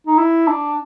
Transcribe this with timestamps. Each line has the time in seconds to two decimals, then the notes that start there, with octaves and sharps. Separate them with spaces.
0.07 D#4
0.18 E4
0.48 D4